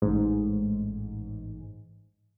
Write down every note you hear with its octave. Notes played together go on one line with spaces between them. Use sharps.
A1 G#2